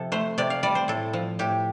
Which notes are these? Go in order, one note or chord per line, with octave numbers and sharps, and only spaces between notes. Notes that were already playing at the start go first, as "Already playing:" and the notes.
Already playing: C3 F3 A4
A3 C5
C3 D5
F5
G3 D5
C5
A2 A4
F3
A2 G4